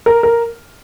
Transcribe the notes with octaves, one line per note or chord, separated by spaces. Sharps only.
A#4
A#4